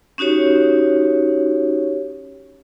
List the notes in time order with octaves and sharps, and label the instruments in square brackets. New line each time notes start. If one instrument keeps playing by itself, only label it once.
[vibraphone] C#4 D#4 F#4 G4 C#5